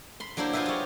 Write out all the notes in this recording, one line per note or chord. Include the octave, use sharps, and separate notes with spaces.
B5 C6
F#3 A#3 D4 E4 C5
E4 F4 G#4 B4 C5 E5
F4 G4 C#5